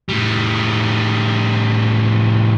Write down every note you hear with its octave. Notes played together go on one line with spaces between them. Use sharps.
A2 G3